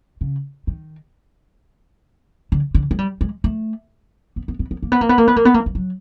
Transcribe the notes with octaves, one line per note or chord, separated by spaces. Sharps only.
C#3
D#3
D3
D3
G#3
G3
G#3
A3
B3
B3
B3
B3
A#3
B3
A#3
B3
A#3
B3
A#3
B3
A#3
F3
F#3